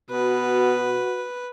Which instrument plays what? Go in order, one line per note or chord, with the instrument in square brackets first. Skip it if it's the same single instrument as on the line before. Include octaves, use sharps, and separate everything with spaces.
[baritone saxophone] B2 [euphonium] F#4 [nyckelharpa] B4